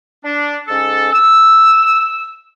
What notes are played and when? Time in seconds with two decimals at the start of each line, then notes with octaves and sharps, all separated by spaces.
0.24 D4
0.67 G#2 C#4 A4
1.13 E6